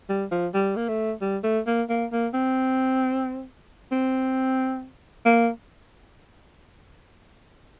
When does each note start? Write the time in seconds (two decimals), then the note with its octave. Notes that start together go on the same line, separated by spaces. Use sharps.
0.09 G3
0.31 F3
0.54 G3
0.76 A#3
0.88 A3
1.21 G3
1.44 A3
1.67 A#3
1.90 A#3
2.12 A#3
2.34 C4
3.92 C4
5.25 A#3